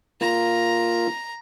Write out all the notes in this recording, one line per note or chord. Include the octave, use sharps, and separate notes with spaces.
A#3 F4 A#5